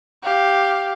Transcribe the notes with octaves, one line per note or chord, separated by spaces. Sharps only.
G4 F5